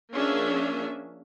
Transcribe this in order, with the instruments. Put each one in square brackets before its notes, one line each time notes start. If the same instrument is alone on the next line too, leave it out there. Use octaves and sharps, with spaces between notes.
[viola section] F3 A#3 C#4 D4 G#4 E5